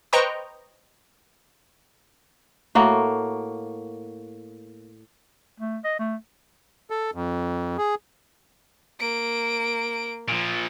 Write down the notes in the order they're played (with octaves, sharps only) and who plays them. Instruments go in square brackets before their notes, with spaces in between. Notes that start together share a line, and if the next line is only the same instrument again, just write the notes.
[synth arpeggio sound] B4 C5 D#5 G5 A#5 C#6
[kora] A2 A#3 F#4
[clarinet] A3
D#5
A3
[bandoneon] A4
F2
G#4
[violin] A#3 D7
[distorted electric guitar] A#2 F3